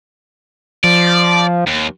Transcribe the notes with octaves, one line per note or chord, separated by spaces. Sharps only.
F3 D5
D#2